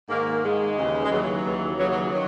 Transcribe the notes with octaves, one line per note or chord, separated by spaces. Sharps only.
G#2 D#3 A#3
G#2 D#3 G#3
D#2 C#3 E3
G#3
D#2 C#3 E3 F#3
D#2 C#3 E3
D#2 C#3 E3 F#3
F#3
D#3 F#3